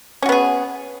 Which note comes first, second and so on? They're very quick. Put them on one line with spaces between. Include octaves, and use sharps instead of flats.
C#4 F#4 B3 G#4